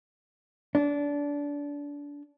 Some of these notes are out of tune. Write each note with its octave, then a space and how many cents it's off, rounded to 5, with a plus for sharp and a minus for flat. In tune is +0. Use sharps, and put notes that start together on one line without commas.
D4 -25